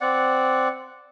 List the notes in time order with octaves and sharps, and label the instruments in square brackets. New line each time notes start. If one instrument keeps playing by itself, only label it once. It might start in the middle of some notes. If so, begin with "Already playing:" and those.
[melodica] C4 D5 F#5